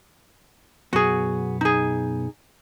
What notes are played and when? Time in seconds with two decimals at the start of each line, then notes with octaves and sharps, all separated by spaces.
0.93 B1 F#2 B3 F#4 G#4
1.61 D#4 G#4